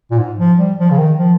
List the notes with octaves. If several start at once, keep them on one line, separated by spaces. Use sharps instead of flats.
A#2
G#2
F3
G3
F3
C#3
D#3
F3